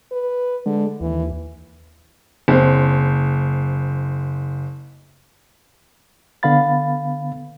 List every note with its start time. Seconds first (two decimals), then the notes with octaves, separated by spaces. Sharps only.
0.12 B4
0.66 D3 G#3
1.01 D#2 E3
2.48 F#1 C4
6.43 D3 B3 F5 B5 A6